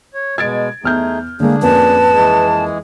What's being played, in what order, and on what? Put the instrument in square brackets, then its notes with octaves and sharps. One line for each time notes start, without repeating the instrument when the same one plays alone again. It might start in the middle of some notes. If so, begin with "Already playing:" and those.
[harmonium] C#5
[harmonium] B2 G#3 [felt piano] G#6 A6 D7
[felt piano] E2 F6 G6 [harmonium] A3 D#4 G#4
[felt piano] D3 G#3 [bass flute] A#3 [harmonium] D4 G#4
[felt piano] F2 A#3 C#4 [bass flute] B4 [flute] A5
[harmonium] E3 G#3 G#4